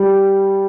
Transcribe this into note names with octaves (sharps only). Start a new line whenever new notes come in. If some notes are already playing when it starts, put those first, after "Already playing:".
Already playing: G3